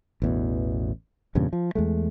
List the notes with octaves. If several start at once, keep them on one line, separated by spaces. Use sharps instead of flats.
A1 E2 B2
E2 G2 A#2 C#3
F3
E2 G#3 A3